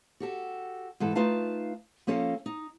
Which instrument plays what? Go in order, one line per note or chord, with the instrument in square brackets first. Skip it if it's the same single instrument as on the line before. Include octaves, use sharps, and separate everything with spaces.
[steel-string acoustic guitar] F#4 G4 A4
G#2 E3 A4
A3 D#4 F4 B4 F5 A5
F3 A#3 C#4 A4 D#5 F5
D#4